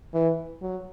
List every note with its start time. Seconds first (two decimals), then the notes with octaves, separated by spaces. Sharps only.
0.14 E3
0.62 F#3